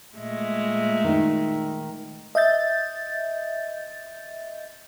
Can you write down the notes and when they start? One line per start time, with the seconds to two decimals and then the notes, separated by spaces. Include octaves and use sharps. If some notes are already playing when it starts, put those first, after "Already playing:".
0.17 A#2 G#3 A3
1.04 D#3 D#4
2.35 D#5 E5 G6 A6